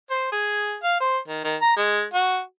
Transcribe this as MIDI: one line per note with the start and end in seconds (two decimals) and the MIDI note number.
0.11 0.29 72
0.32 0.76 68
0.83 0.99 77
1.00 1.18 72
1.28 1.43 51
1.44 1.56 51
1.61 1.75 82
1.77 2.03 56
2.13 2.40 66